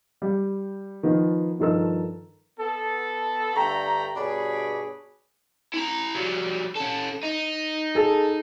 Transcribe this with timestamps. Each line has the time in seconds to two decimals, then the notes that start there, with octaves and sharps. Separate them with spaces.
0.22 G3
1.03 D#3 F3 B3
1.59 G2 D#3 F3 A4 A#4 E6
2.59 B3 A4
3.55 G2 D3 A3 G5 A#5
4.16 G2 B2 D4 G#4 C#5 B5
5.74 E4 A#5
6.15 F#3 G3
6.76 C#4 A4
7.23 D#4
7.95 G#4 A4